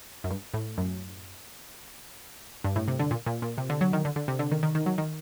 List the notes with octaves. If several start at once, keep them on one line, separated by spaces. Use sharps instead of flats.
F#2
G2
A2
F#2
G2
A2
C3
D3
A#2
A#2
A#2
C3
D3
F#3
D#3
D3
D3
C3
D3
D#3
D#3
D#3
F#3
D#3